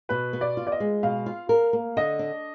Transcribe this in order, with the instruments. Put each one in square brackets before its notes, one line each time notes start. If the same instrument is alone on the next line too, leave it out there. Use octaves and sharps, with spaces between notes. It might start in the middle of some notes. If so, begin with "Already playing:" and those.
[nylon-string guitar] B2 [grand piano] B4
[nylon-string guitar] B3
[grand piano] D5
[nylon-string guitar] F4
[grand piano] D5
D#5
[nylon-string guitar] G#3
[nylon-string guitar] B2 [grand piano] F5
[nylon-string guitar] F4
A#4
A#3
[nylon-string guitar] D3 [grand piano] D#5
[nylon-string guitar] D4